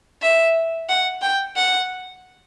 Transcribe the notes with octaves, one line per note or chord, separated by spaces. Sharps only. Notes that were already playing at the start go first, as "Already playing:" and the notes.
E5
F#5
G5
F#5